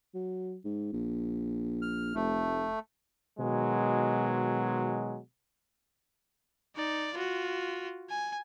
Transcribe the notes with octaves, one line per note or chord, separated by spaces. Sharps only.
F#3
G#2
A#1
F6
F1 A3
B2 D#3 F#3 G#3
D#4 D5
F4 F#4
G#5